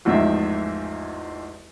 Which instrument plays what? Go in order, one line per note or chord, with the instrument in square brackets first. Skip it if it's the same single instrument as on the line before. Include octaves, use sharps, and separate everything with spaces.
[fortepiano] A1 E2 G#2 F3 D#4 E5